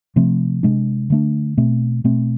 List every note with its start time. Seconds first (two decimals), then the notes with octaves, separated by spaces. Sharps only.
0.16 C3 F3 A3 C4
0.63 C3 G#3 D4
1.10 D3 A3 D4
1.58 B2 A3 C4
2.04 B2 A3 C4